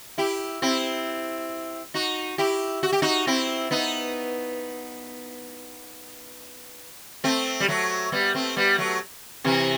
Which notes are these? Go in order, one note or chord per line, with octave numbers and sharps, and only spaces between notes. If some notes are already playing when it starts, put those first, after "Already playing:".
E4 G4
C4 E4
D#4 F#4
E4 G4
F#4
G4
D#4 F#4
C4 E4
B3 D#4
A3 C4
G3
F#3 A3
G3 B3
A3 C4
G3 B3
F#3 A3
C3 E3